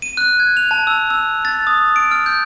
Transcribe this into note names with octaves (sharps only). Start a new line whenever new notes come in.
D#7
F#6
G#6
F7
A5
E6
E6
A6
D#6
D7
F6
G6